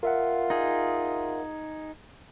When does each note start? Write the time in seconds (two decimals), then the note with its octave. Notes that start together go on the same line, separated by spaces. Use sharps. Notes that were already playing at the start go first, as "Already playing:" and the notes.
0.03 F4 A#4 E5 F#5
0.50 D#4 G#4